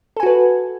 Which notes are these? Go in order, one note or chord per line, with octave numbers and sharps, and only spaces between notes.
F#4 A4 B4 G#5